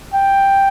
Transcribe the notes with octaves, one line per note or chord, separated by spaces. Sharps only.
G5